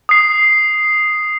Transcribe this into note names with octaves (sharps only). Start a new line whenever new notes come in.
D#6 C7